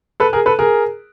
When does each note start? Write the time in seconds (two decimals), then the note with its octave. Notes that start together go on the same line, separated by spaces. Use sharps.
0.20 A4 B4
0.33 G#4 A#4
0.46 A4 B4
0.59 G#4 A#4